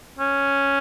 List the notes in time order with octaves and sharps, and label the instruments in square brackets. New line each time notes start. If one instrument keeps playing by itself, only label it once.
[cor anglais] C#4